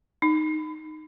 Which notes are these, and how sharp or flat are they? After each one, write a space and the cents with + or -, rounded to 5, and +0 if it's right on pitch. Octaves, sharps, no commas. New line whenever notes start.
D#4 -5